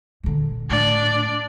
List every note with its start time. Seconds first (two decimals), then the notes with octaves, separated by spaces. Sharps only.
0.23 A#2 D3
0.70 A2 D4 D5